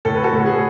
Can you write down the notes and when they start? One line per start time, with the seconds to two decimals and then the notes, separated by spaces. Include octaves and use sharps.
0.05 A2 A4
0.15 B4
0.23 F#4 A4
0.33 A2
0.46 G#4 B4